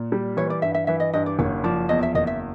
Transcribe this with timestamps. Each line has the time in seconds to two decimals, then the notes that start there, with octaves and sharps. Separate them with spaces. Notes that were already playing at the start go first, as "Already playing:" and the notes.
Already playing: A#2
0.12 G3
0.37 E3 C#5
0.50 D5
0.62 G2 E5
0.74 E5
0.87 E3 E5
1.00 D#5
1.13 G2 D#5
1.26 D5
1.39 F#1 C#5
1.64 F3 D5
1.89 E2 D#5
2.03 E5
2.15 F#1 D#5
2.27 E5